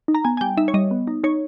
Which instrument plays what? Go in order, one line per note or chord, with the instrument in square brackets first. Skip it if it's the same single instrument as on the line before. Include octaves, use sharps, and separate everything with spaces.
[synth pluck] D#4
A#5
B3 G#5
G#5
G3 G5
D#4 E5
C#5
G3 D#5
B3
D#4
D#4 C#5